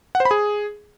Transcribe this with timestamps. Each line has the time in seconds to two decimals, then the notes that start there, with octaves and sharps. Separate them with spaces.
0.15 F#5
0.20 C5
0.25 B5
0.31 G#4